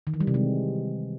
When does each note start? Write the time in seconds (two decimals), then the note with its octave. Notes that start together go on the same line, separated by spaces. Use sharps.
0.07 D#3
0.14 E3
0.20 G3
0.27 C3
0.34 G#3